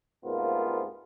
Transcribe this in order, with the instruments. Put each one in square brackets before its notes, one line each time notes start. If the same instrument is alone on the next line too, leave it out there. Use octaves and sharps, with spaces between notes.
[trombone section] C2 G#2 A#3 B3 F4